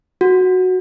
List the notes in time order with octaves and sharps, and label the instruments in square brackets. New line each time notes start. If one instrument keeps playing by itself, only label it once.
[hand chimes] F#4